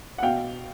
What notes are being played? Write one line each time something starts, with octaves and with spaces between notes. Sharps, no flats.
F#5
B2 F5 G5